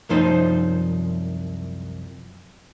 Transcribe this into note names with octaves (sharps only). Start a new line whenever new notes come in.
C2 F#2 F3 D#4 C5